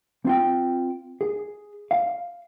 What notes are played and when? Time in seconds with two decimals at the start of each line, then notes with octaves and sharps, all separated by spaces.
0.25 C4 F4 G5
1.21 G#4
1.91 F5